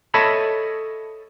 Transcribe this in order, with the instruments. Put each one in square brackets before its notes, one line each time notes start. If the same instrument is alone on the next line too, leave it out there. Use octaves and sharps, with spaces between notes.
[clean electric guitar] A4 C#5 D#5 E5 A5 B5